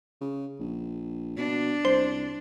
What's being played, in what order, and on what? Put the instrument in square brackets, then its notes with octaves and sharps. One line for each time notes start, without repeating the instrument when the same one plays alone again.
[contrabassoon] C#3
A#1
[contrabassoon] B2 [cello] D4
[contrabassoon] C2 [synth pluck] C5